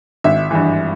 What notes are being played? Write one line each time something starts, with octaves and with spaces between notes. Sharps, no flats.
G#1 E5
G2 E3